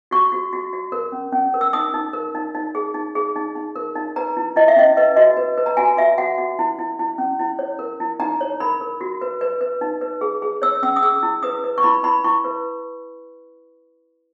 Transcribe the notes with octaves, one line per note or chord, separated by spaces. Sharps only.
F#4 C#6
F#4
F#4
F#4
A#4
C#4
C#4
A#4
E6
D#4 D#6
D#4
A#4
D#4
D#4
G#4
D#4
G#4
D#4
D#4
A#4
D#4
B4 A#5
E4
E4 D#5
E5
C#4 D#5
B4 D#5
F#4 D#5
B4
B4
A#5
F#4 G#5
F#4 E5
F#4 F#5
F#4
E4
E4
E4
C#4
E4
C#5
A#4
E4
D#4 A#5
C#5
A#4 B5
A#4
F#4
B4
B4
B4
D#4
B4
G#4
G#4
C#5 E6
C#4 E6
D#6
G#4 E6
E4
B4 D#6
B4
C#6
E4 B5
E4 B5
E4 C#6
B4